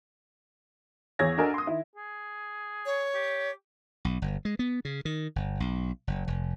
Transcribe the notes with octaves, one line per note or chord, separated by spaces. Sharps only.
E2 G#4 C#5 E6 G#6 A#6
D4 F#4 A4 A#4 D#5 G#5
C6 D#6
D#3 E4
G#4
C#5
G4
B1
G1
G#3
B3
C#3
D#3
G1
B1
F#1
F1